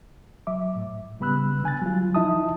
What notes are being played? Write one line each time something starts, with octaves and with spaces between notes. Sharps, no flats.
F#3 E5 D6
A2
C#3 G3 B3 B5 E6 F#6
D3 G#5 F#6 A6
F#3 G3 F4
F3 D#4 E4 E5 A5 D#6